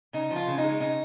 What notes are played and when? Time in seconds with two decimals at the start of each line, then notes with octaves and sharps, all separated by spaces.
0.13 C#3 D#4
0.31 F3
0.36 F4
0.48 C#3
0.58 D#4
0.63 G#3
0.80 C#3 D#4